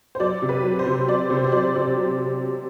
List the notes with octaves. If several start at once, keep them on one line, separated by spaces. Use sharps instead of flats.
C5
F#3 D5
C3
B4
F#3
C5
C3
F#3 D5
C3 C5
C5
F#3 D5
C3 D5
F#3